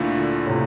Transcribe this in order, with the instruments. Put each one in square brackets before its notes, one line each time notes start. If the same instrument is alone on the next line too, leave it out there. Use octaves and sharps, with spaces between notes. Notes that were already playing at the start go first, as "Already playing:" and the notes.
Already playing: [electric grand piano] D2 D3 A3 E4 [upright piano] A#2
[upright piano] A2 C3